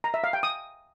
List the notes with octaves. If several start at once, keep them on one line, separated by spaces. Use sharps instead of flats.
A#5
E5
F5
G5
D#6